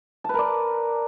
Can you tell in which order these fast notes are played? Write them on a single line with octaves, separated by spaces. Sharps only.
A5 B4 A#4 D5